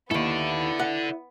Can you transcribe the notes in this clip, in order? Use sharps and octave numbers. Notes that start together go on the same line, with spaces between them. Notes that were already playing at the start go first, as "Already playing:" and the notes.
D#2 G#2 B3 E4 A4 D5
F#5